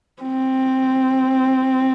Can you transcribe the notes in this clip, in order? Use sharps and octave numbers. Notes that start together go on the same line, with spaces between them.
C4